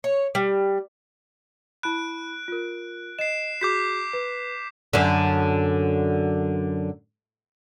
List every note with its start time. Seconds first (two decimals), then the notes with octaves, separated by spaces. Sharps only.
0.04 C#5
0.35 G3
1.83 E4 B5 F#6 D7
2.48 F4 A#4
3.19 D#5 C7 E7
3.61 F#4 G#4 D6 G6 B6
4.13 B4
4.93 F#2 D3